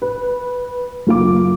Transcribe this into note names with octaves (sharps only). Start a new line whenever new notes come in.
B4
F#1 F4 D6